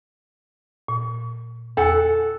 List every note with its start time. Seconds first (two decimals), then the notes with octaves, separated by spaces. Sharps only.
0.88 A#2
1.77 E2 A4 F#5 G#5